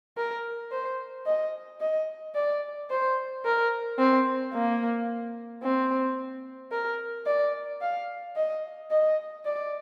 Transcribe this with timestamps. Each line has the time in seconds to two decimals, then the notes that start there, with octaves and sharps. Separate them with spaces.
0.17 A#4
0.72 C5
1.26 D#5
1.81 D#5
2.35 D5
2.90 C5
3.45 A#4
3.99 C4
4.54 A#3
5.63 C4
6.72 A#4
7.27 D5
7.82 F5
8.36 D#5
8.91 D#5
9.45 D5